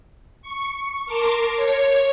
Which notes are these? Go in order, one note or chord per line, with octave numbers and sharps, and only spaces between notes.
C#6
A#4 A5 C6 D6
C#5